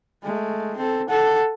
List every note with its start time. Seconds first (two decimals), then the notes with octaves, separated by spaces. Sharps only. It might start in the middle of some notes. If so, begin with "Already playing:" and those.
0.23 G#3 A3
0.77 C4 A4
1.09 A4 F#5